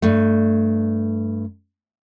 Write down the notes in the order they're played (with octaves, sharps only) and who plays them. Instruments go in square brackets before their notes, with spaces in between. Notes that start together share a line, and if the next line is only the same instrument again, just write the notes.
[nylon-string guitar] G2 A3